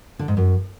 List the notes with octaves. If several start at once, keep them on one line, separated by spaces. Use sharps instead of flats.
D3
G#2
F#2